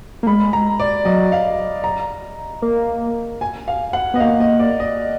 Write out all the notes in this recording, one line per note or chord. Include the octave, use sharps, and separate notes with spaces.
A#3
G#3 B5
A#5
D5
F#3 D#5
F5
A#5
A#3
G#5
F5
F#5
B3 D#5
A#3 F5
D#5
D5
D#5